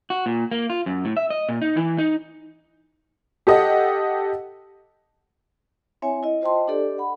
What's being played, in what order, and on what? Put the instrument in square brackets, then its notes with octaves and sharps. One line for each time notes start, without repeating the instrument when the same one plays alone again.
[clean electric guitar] F#4
A#2
A#3
F4
F#2
A2
E5
D#5
A#2
D#4
E3
D#4
[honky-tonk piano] G4 A4 D#5 F#5
[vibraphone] C4 E4 C#5 E5 G#5
E4 D#5
F4 C5 D#5 G5 A5 C6
D4 G4 A4 D5
F#5 B5